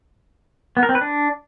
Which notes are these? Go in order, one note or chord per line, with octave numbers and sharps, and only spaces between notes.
B3
A#4
C4
B4
D4